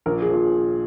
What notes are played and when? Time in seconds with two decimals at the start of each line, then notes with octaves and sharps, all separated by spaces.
0.06 A#1 A#4
0.22 G#4
0.30 A#2 F3